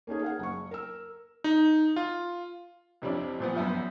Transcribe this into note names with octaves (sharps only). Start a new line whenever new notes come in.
A#3 C#4 D#4 G#4
G#4 F5 F#5
F#1 C#6
A#4 E6
D#4
F4
F2 C3 C#4 D4 E4
A#2 F3 B3
A#1 F#2 B3 E5 G6